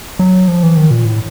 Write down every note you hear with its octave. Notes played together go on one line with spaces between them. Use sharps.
F#3
F3
E3
D#3
A#2
A2